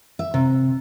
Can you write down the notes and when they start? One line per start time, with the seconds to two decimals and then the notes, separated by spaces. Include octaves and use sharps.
0.19 E5
0.34 C3